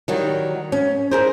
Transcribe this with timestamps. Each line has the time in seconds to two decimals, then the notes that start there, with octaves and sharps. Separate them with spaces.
0.08 D#3 F#3 G3
0.72 C#4
1.11 G#4 A#4 C5